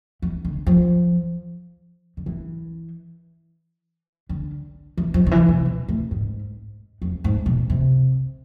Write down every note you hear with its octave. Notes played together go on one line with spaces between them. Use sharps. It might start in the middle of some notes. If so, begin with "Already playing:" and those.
E3
D3
F3
D3
E3
D3
E3
F3
D3
E3
C3
B2
A2
G#2
F2
G#2
B2
C3